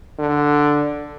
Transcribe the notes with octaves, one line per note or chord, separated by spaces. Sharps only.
D3